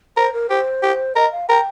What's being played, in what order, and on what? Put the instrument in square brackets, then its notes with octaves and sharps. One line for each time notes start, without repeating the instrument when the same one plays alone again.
[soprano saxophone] A#4 [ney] C5
[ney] A#4
[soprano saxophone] G4 [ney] C5
[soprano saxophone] G4
[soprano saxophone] A#4 [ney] D#5
[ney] F5
[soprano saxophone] A#4 [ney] G5